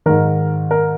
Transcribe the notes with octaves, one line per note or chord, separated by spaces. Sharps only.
G#2 D#3 A#4
A#4